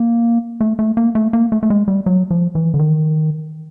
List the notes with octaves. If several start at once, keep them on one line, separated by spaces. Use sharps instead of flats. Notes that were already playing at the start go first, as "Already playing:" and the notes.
Already playing: A#3
A3
A3
A#3
A3
A#3
A3
A3
G#3
G3
F#3
F3
E3
D3
D#3